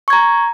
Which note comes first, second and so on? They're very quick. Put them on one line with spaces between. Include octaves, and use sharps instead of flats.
C#6 G#6 A#5